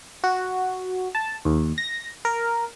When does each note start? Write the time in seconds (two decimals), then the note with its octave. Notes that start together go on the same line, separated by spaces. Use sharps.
0.24 F#4
1.15 A5
1.45 D#2
1.78 A#6
2.25 A#4